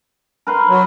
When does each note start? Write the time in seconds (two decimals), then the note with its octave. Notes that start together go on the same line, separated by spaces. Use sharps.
0.47 A#4 B4 C6
0.69 F#3